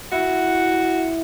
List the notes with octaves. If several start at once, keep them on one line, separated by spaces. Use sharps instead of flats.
E4 F#4